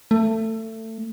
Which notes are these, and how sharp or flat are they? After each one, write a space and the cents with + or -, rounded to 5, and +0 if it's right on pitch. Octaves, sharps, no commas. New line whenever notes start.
A3 +20